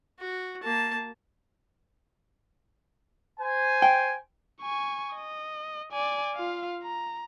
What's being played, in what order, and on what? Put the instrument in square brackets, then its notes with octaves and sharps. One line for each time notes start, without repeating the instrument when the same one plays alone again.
[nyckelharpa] F#4
A#3 A5
[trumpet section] C5 G#5
[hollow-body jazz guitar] G5
[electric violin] G#5 C#6
D#5
D5 G#5
F4 F5
A#5